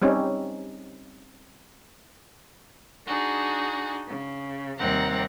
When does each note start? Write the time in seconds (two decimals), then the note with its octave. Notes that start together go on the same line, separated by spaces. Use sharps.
0.02 G3 C4 C#4 D#4
3.05 D4 D#4 F#4 G#4
4.07 C#3
4.79 D#2 C3 G3 C4 F#5 A#5